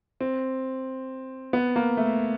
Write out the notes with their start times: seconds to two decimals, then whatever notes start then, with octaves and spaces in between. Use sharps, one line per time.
0.21 C4
1.53 B3
1.76 A#3
1.97 A3